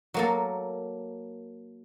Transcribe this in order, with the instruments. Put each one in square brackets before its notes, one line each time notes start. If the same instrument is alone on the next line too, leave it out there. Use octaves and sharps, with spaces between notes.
[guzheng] F#3 A#3 A4